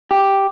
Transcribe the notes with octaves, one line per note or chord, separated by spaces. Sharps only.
G4